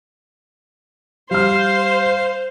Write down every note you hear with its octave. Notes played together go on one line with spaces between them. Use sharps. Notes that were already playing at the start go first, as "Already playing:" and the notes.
G3 C5 F5 F6